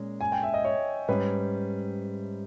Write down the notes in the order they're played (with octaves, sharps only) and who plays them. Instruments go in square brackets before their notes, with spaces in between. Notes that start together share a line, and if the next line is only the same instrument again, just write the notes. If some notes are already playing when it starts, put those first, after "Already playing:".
Already playing: [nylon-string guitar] A#2 G#3 C#4
[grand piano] G#5
G5
E5
D#5
C#5
[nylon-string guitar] G#2 G3 C#4 [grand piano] B4